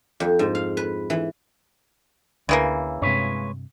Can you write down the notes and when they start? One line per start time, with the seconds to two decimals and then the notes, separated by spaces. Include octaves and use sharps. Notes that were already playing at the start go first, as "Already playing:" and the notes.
0.20 F2
0.39 G#2
0.55 F5
0.77 B4
1.10 E3
2.49 D2 C#3 E3 A#3
3.02 G2 C3 G#3 B4 C#5